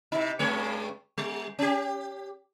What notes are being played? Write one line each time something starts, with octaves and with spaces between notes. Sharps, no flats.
C3 D#4
G2 G#3 C#5
G3
C#4 G4